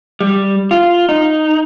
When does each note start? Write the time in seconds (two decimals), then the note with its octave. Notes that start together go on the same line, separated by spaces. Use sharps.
0.21 G3
0.71 F4
1.09 D#4